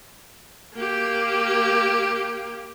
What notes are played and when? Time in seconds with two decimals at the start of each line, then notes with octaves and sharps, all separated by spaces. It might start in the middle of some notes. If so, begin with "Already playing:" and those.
0.76 A#3 G4